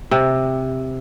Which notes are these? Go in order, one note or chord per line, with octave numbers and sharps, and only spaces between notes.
C3